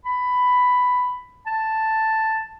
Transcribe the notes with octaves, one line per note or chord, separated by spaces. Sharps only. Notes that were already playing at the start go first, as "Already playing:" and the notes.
B5
A5